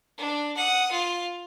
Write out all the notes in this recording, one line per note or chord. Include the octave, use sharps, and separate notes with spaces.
D4
F#5 D#6
F4